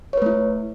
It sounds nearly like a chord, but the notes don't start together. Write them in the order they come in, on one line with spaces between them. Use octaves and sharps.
C#5 B4 A3 E4